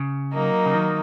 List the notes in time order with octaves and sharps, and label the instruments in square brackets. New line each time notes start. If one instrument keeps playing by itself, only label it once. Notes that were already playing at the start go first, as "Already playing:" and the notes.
Already playing: [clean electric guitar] C#3
[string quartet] F#3 A#3 D#4
[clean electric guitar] C#3
D#3